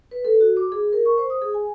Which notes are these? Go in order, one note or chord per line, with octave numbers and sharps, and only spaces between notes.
B4
A4
F#4
D6
G#4
A#4
C#6
C5
D#6
G#4
G#5